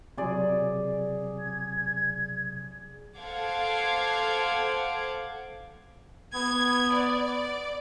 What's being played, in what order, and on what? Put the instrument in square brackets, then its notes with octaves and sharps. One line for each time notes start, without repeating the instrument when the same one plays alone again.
[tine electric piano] C3 F#3 [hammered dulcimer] G#4 D5
[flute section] G#6
[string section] A4 C5 F5 F#5 D6 G#6
[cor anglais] B3 [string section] G#6
[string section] D5